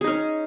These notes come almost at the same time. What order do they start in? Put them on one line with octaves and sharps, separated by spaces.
G#4 D#4 C#4